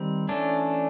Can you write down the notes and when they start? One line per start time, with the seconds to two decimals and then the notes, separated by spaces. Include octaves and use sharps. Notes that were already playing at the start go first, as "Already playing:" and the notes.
Already playing: D#3 G3 C4
0.29 E3 A3 C#4 D4